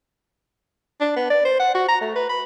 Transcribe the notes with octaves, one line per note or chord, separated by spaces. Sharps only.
D4
B3
D5
C5
F#5
F#4
A#5
A3
B4
B5